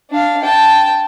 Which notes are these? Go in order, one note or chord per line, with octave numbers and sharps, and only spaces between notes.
D4 F5
G5 A5